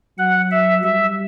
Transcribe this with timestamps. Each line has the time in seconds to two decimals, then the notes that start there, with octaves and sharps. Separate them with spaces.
0.18 F#3 F#5
0.51 E5
0.83 G3 E5